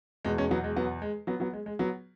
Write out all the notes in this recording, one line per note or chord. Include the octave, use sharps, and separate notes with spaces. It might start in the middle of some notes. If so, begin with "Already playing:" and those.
E2 B2 G#3
G#3 C#4
F#3 B3
G#3
F#3 B3
G#3
F#3 B3
F#3 B3
G#3
G#3
F#3 B3